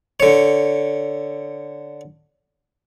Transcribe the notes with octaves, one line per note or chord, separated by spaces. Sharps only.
D3 C#5